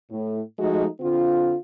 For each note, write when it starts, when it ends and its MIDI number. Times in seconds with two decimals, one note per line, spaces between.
0.11 0.41 45
0.59 0.87 53
0.59 0.87 56
0.59 0.87 57
0.59 0.87 63
0.59 0.87 66
1.00 1.54 50
1.00 1.54 60
1.00 1.54 65